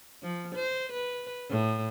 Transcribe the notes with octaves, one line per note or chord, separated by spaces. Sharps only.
F3
C5
B4
A2